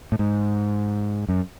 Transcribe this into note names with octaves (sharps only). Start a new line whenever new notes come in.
A2
G#2
F#2